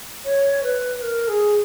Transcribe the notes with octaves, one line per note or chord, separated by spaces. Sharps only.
C#5
B4
A#4
G#4